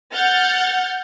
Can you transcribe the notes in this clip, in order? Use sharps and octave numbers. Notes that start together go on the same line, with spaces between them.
F#5 F6 G6 A6